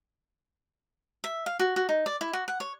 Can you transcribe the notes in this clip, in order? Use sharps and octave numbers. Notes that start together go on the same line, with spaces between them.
E5
F5
F#4
F#4
D#4
D5
E4
F#4
F#5
C#5